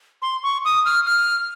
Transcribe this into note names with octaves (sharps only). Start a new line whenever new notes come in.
C6
C#6
D#6
F6
F6